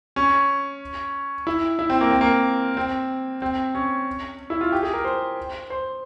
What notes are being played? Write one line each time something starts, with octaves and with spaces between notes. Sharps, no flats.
C#4
E4
E4
C4
A#3
C4
A#3
C4
C4
C#4
E4
F4
G4
G#4
A#4
C5
C5